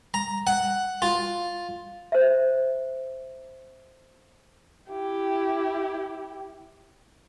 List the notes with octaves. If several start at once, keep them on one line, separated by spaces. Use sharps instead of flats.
A#5
F#5
F4
C5 E5
E4 G4